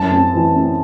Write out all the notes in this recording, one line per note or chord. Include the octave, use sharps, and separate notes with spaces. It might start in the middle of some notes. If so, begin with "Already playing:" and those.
Already playing: F#2 A5
C4
E3
C4